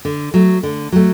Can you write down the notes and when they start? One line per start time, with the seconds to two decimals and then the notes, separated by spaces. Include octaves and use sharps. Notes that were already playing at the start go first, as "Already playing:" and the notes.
0.05 D3
0.34 F#3 A3
0.63 D3
0.92 F#3 A3